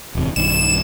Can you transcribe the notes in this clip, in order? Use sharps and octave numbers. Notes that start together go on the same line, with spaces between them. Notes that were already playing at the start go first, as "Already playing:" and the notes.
D1 E2 C3
B1 G2 D#3 E7